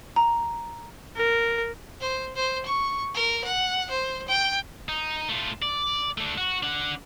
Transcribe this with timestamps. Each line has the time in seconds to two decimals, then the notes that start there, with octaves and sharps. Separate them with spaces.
0.16 A#5
1.17 A#4
2.00 C5
2.36 C5
2.66 C#6
3.14 A#4
3.44 F#5
3.90 C5
4.28 G5
4.89 D#4
5.29 A3 F4
5.62 D5
6.18 A3 D4
6.38 F#4
6.63 D4 F#5